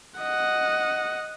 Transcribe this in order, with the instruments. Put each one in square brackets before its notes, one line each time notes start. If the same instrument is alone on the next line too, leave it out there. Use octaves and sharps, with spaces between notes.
[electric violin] D#5 F#5